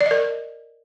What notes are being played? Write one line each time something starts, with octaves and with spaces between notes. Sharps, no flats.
D5
D#5
A#4